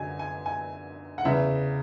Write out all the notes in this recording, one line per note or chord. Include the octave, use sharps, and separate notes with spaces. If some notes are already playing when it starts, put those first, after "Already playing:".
Already playing: F#2 D3 F#3 G#5
G#5
G#5
F#5
E2 C#3 E3 E5